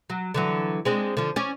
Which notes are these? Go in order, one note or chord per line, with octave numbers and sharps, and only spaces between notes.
F#3
D3 E3 F#3
G#3 C4 D4
D3 F3
C#4 D5